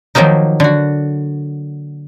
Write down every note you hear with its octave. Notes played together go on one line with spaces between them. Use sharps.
D#3 F3 F#3 A#3 D#4
D3 F#4